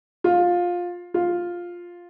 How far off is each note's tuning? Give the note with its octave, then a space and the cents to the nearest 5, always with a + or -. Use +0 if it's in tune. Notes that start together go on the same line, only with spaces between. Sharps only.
F4 +15
F4 +5